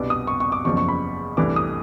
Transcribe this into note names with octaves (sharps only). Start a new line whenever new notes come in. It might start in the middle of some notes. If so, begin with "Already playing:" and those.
Already playing: C2 B2 G3 B3 D4 D6
D#6
C#6
C#6
D6
F#1 E2 C#3 F3 C#6
C#6
B5
C2 C3 E3 A3 D4 D6
D#6